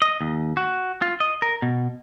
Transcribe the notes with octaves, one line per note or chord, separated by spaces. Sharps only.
D#5
D#2
F#4
F4
D#5
A#4
B2